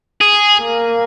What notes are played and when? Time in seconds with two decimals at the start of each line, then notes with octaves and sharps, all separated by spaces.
0.21 G#4
0.61 A#3